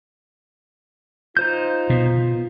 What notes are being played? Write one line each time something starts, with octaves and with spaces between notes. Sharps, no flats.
D#4 F4 C5 G6
B2